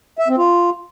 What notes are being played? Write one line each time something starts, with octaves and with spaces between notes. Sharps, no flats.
E5
C4
F4